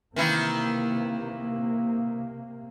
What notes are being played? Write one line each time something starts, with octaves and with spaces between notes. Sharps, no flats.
C3 D#3 E3 A#3 E4